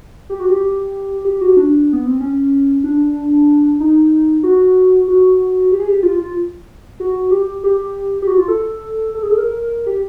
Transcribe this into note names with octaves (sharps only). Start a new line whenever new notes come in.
G4
F#4
G4
G4
F#4
D4
B3
C4
C#4
D4
D#4
F#4
F#4
G4
G#4
G4
F4
F4
F#4
G4
G4
G4
F#4
F4
A4
A4
G#4
A4
A#4
G4